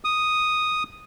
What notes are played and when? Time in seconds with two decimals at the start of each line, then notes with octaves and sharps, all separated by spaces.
0.05 D#6